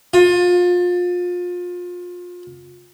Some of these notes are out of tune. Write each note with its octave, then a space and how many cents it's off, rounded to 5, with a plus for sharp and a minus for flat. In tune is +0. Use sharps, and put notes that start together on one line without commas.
F4 +30